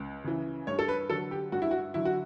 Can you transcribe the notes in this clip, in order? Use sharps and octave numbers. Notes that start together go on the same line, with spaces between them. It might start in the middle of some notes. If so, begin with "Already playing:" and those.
Already playing: C#2
C#3 E3
G2 C#5
A4
B4
D3 F#3 A4
G4
G2 F#4
E4
F#4
D3 F#3 E4
F#4